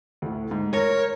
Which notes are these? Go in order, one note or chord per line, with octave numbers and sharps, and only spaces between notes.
D2 A2
G#2
A#4 C#5 A#6